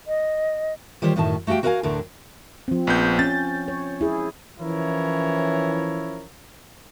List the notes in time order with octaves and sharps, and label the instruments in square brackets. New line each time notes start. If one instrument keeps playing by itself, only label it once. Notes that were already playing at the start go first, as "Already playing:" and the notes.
[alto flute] D#5
[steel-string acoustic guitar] D#3 G3 F4 G4 C5 C#5
F#2 A2 D#3 A3 A5
A3 F#4 G4 F5 G5
F#4 A#4 B4 D#5 F5 G#5
D2 A2 D3 A3 A#4
[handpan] F3 C4
[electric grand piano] A#1 B3 G6
[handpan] C#4 [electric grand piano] A6
[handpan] C#5
E4 G#4
[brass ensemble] E3 F3 C#4 E4 A#4 C#5